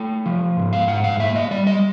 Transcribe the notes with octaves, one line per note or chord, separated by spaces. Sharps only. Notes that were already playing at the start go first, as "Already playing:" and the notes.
Already playing: A3 G5
F3
G#2
F5
G#2 F#5
F5
A#3 E5
D#5
G3 D5
D#5